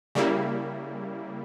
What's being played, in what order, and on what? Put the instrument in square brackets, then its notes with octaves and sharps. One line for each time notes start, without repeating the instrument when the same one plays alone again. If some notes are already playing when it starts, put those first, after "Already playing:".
[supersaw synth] C#3 G3 A#3 E4